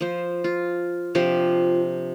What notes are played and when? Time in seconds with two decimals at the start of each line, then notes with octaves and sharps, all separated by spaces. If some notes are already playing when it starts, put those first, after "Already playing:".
0.01 F3 C5
0.44 F4
1.15 C3 F3 D4 G4